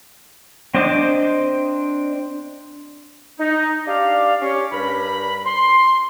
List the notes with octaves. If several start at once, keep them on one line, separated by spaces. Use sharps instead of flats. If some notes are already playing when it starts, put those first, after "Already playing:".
C4 D4 C5 D#5 D6
D#4
D4 G4 D5 F5
C#4 G4 C#5
G2 A#4 B5
C6